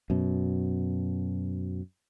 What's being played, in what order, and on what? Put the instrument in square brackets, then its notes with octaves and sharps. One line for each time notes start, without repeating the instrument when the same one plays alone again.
[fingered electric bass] F#2 B2